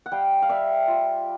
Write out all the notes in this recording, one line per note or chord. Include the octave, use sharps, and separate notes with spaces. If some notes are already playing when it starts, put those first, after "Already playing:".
F#5
G3 F5 G5
F5
G3 D5 E5
F4